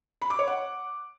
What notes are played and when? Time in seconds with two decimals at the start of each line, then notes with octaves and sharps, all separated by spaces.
0.22 B5
0.30 D6
0.39 C#5
0.47 F#5